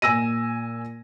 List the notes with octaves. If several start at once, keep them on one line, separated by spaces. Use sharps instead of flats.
A#2 G#5 E6 A#6 D#7